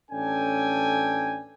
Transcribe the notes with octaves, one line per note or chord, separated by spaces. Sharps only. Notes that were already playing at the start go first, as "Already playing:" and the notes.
A1 C#4 D4 A4 G5 G#5